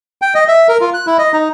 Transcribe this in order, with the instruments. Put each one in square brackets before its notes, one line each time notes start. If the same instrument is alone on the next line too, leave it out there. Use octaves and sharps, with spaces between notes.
[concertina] G5
D#5
E5
A#4
F4
F#6
E4
D#5
D#4